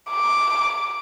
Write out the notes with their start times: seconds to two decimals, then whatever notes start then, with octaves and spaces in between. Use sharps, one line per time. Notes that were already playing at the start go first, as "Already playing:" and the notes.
0.10 D6